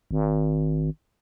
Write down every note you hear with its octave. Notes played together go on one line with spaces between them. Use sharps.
G#1